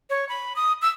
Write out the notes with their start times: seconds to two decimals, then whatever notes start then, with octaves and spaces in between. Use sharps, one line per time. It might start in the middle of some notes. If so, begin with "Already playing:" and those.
0.10 C#5
0.29 B5
0.56 D#6
0.82 E6